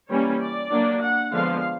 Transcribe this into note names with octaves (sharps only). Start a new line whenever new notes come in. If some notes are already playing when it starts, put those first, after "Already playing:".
E3 G3 A#3 C#4 C#5
D5
F#3 A#3 D4
F#5
D3 F3 G#3 B3 F5